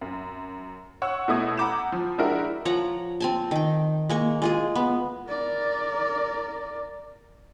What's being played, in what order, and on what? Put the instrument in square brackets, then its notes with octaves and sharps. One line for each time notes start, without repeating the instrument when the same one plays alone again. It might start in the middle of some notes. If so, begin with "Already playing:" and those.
[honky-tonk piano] F#2
C#5 F#5 C#6 E6
B2 A3 E4 D#6 G#6
F#5 A#5 B5 D6 G6 E7
F3
G#3 D4 E4 F#4 G4 A#4
[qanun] F3 C#5 F#5 A#5
C4 G#5 A5
D#3 G5
G#3 A#3 C#6
G#3 F4 G#4
B3
[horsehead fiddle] A#4 D5